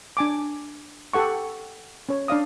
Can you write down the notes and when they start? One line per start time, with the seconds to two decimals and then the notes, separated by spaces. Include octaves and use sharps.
0.17 D4 G#5 D6
1.13 G4 A4 F#5 C#6
2.09 C#4 C#5
2.28 D4 D5 F5 D#6